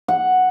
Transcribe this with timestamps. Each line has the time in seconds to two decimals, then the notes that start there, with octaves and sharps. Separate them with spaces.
0.08 F#5